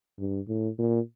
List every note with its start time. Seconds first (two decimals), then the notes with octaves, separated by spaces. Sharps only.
0.19 G2
0.48 A2
0.79 A#2